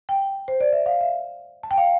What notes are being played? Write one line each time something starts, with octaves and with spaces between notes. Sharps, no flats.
G5
C5
D5
E5
F5
E5
A5
G5
F5